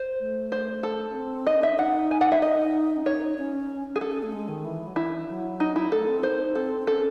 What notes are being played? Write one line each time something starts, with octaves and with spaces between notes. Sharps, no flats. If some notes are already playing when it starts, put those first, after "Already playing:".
Already playing: C5
A3
C5
A4
C#4
C4
D#4 D#5
C#4
D#4 E5
D#4 F#5
G#5
F#5
E5
D#4 D#5
C#4
D#4 C#5
C#4
G#4
A4
C#4
A3
G#3
D#3
E3
F#3
E3 E4
F#3
D#4
E4
A3 A4
C4
D#4 C5
C4 A4
C#4 A4